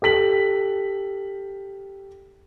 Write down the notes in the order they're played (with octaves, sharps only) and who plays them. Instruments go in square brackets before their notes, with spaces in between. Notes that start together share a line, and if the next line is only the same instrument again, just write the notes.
[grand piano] G4 A4 B6 F#7